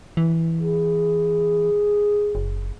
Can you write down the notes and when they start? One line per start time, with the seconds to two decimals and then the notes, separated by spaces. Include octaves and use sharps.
0.17 E3
0.60 G#4
2.35 F#1